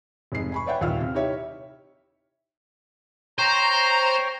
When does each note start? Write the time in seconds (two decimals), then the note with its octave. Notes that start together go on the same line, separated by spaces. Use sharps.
0.32 F1 G#2 G#4 C7
0.52 G#5 B5 C#6
0.66 B4 C#5 D5 E5 F#5 G5
0.81 D#1 D#2 F4 F5 E6 F6
1.00 C3
1.14 D#4 E4 G4 C#5 E5
3.39 C5 C#5 G5 A#5